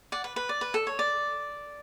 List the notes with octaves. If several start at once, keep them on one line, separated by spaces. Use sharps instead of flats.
D5 F#5
B4
B4
D5
B4
A4
C#5
D5